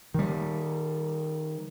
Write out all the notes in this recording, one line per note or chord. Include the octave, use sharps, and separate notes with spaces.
D#3 G3